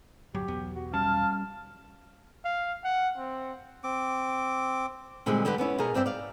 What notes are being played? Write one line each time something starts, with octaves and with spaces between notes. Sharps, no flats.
D1 G1 F#3 G4
B1 E2 B3
F#4
G3 C#4 F5 A5 F6
F5
F#5
C4
C4 D6
A#2 D3 G3 G#3 C4 G#4
D3 G3 G4 B4
B3 C#4 E4 C#5
B2 G#4 A#4
G2 C4 D5 E5 G5
D5 F5